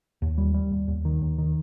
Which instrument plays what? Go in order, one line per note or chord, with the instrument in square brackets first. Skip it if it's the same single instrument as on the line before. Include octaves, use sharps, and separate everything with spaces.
[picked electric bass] D#2
G3
G3
D#2
D#2
D#3
D#2
D#3